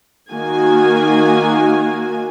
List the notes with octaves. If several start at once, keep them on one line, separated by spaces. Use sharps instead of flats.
D#3 A#3 F#4 G#5